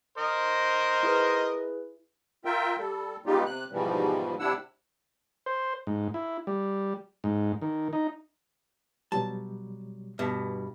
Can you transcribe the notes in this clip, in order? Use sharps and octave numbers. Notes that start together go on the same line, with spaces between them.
A#4 C5 D#5
E4 G#4 B4
F4 A#4 E5 G5
G3 A4
G3 G#3 B3 D#4 F4 G4
C3 F#6
G#2 B2 E3 F3 G3
C3 G3 D4 E4 F#5 E6
C5
G#2
E4
G3
G#2
D#3
D#4
B2 F#3 G3 A5
G2 B2